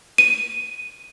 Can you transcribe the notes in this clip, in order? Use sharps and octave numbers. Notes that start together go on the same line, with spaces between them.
D#7